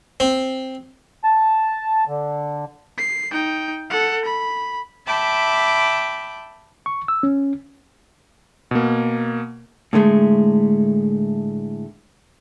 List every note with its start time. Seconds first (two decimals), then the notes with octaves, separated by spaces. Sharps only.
0.20 C4
1.24 A5
2.08 D3
2.98 C7
3.31 D#4 G5
3.90 A4 F#5
4.25 B5
5.06 E5 G5 A5 B5 D6
6.86 C#6
7.08 E6
7.23 C#4
8.71 B2 A#3
9.93 A2 D3 G#3 A3